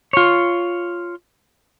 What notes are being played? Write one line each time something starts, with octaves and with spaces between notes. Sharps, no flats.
F4 C#5